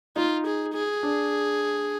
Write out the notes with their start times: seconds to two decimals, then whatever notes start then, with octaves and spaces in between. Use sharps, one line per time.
0.16 D#4 F4
0.46 G#4
0.74 G#4
1.03 D4